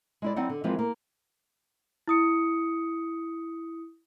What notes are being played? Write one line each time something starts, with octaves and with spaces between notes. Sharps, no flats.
G#3 E4 D5
F#3 C4 D#4 E4 D5 F#5
D3
E3 F3 G#3 A#3 C4 F4
A#3
E4 D#6 C#7